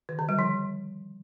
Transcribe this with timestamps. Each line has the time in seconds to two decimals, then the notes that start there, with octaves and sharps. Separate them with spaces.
0.09 D#3
0.19 D3
0.29 G3
0.39 F3